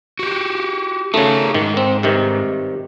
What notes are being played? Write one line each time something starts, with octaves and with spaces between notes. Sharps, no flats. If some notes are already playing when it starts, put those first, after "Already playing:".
F#4 G4
C#3 A3 D#4 F#4 A#4
G#2 D#3
C4
G2 C3 D#3